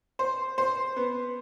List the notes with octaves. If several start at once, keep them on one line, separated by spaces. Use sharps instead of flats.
C5
C5
B3